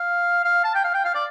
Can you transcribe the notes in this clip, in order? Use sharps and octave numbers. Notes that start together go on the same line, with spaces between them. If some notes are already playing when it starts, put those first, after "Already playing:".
Already playing: F5
F5
A5
G5
F5
G5
F5
D5